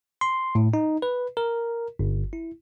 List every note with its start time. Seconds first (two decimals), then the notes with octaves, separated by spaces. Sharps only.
0.21 C6
0.55 A2
0.74 D#4
1.02 B4
1.37 A#4
1.99 G1
2.33 E4